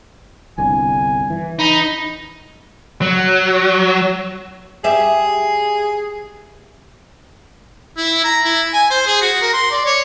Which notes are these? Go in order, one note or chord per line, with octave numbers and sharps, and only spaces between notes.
G1 C2 D3 G#5
E3
D#4 B5
F#3
G4 G#4 E5
E4
A#5
E4
G#5
C5
G#4
F#4
A#4
C6
D5
C#5